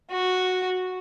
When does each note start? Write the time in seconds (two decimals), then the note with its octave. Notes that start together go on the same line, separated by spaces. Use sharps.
0.11 F#4